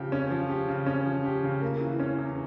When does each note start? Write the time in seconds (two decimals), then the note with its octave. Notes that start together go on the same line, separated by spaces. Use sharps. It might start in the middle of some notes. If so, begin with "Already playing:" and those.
Already playing: C#3 F3 G4
0.12 C#4
0.31 F3
0.49 G4
0.68 C#3
0.86 C#4
1.06 F3
1.25 G4
1.43 C#3
1.62 A#3
1.81 E3
2.00 C#4
2.18 E2